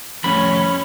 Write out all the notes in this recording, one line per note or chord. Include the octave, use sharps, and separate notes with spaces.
F2 A2 C#4 C#5 B5